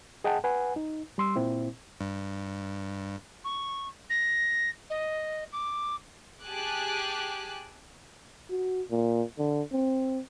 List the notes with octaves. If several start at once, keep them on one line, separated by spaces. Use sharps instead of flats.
G#4 D#5 F#5 G5 A5
B4 F#5 G#5
D#4
G3 C6 E6
A#2 C4 E4
G2
C#6
A#6
D#5
D6
G4 G#4 G#5 A5 D6 F#6
F#4
A#2
D3
C4